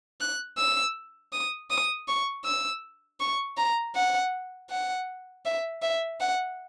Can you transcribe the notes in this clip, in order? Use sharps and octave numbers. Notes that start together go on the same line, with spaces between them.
F#6
E6
D#6
D#6
C#6
E6
C#6
A#5
F#5
F#5
E5
E5
F#5